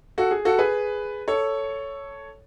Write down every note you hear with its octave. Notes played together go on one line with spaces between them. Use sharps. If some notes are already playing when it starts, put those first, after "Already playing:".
F#4 A4
G#4
F#4 A4
G#4 B4
A4 C#5